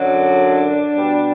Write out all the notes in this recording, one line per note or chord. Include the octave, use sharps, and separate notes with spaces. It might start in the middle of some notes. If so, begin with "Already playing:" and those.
Already playing: F#2 D3 F#3 D4
B2 G3